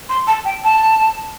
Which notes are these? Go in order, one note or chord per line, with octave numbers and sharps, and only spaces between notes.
C6
A5
G5
A5